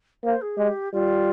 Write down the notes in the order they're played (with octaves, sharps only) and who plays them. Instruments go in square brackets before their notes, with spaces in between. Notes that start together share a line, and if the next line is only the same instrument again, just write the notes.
[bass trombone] A#3 [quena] C5
[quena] G#4
[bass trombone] G#3 [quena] G4
[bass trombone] G3 [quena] F4